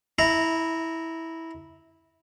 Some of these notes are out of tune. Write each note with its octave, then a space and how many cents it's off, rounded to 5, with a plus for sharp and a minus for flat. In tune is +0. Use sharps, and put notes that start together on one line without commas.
E4 -15 A#5 -10